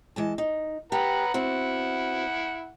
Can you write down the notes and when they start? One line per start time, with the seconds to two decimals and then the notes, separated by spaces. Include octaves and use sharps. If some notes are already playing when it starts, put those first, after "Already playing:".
0.16 E3 G#3 A5
0.38 D#4
0.92 G4 B4 F#5 A#5
1.34 C4 E4 F#4 F#5